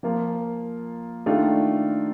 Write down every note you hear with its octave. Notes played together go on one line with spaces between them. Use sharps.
F3 A#3 F4
D#3 A3 D4 F4